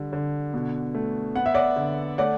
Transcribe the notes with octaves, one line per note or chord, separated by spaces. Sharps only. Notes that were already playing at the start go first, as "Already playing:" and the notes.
Already playing: D3 G3
D3
B2
A3
B3 F#5
E5
D5 F#5
D3
A3 D5 F#5